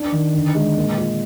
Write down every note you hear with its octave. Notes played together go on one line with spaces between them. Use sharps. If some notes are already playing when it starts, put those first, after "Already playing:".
Already playing: D4
D#3
D3
G#3
A#2
F4